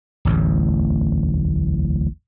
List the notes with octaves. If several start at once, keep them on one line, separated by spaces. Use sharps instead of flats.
D1 A1 E2